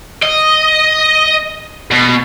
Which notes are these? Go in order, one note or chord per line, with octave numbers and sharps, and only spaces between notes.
D#5
B2